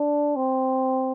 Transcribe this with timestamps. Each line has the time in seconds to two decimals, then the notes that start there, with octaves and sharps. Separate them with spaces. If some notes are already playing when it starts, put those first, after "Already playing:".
Already playing: D4
0.36 C4